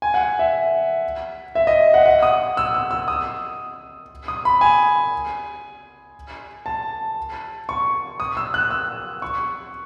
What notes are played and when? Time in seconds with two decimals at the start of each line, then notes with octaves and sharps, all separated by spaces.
0.02 G#5
0.14 F#5
0.39 E5
1.55 E5
1.67 D#5
1.94 F#5
2.06 F#5
2.23 D#6
2.57 E6
2.74 E6
2.91 E6
3.08 D#6
4.28 D#6
4.45 B5
4.61 G#5
6.66 A5
7.69 C#6
8.20 D#6
8.37 E6
8.54 F#6
8.70 E6
9.22 C#6